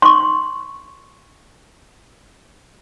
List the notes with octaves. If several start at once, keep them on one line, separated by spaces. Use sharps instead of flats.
C6 C#6